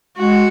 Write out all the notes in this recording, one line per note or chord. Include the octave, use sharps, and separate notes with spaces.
G#3 F#4